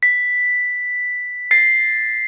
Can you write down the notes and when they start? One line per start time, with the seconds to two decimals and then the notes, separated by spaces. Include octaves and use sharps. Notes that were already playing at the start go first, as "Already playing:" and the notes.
0.03 B6
1.51 A6 C7